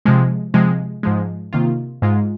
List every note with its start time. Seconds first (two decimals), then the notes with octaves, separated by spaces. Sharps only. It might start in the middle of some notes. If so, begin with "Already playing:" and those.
0.06 C3 F3 G#3
0.54 C3 F3 G#3
1.03 G#2 F3 G#3
1.53 C3 D#3 A#3 F4
2.02 G#2 G#3 F4